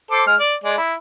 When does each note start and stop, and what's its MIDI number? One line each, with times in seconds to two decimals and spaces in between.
0.11 0.25 69
0.11 0.25 72
0.11 0.25 86
0.27 0.36 56
0.27 0.36 89
0.39 0.55 74
0.64 0.77 56
0.64 0.77 74
0.78 0.93 64